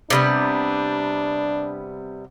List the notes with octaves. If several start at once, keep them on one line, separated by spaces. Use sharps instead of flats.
C3 G3 B3 D4